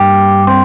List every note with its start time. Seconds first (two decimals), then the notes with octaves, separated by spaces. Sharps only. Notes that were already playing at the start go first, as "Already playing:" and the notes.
Already playing: G2 G3 A#3 G4
0.47 C4